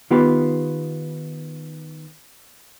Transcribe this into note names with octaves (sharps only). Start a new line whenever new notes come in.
D#3 B3 F4 G4 B4